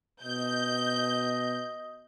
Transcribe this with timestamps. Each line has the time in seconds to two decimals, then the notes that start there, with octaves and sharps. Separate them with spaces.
0.23 B2 D#5 G6